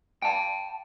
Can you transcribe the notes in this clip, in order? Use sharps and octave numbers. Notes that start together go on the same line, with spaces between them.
G5 A5